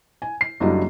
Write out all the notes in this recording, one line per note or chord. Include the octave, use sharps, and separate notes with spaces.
G#5
C7
F#1 F#3 G3 A#3 D4 D#5